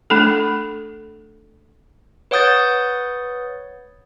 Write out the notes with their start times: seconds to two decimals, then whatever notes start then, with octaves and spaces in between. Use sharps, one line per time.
0.10 A3 D4 A4
2.31 B4 C#5 F#5 D#6 G6 A6